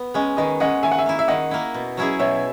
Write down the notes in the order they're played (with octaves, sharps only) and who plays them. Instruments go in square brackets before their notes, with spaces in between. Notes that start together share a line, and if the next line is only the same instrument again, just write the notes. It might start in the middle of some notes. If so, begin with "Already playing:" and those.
Already playing: [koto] B3
[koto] G#3 C#4 [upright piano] B4 D#5
[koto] D#3 [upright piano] B4 D#5
[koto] G#3 C#4 [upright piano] D#5 F#5
[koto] D#3 [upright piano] E5 G#5
[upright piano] F#5
E5 G#5
[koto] A#3 E4
[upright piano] E5
[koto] D#3 [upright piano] D#5 F#5
[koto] A#3 E4
B2
F#3 C#4 E4 G#4
[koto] B2 [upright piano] C#5 E5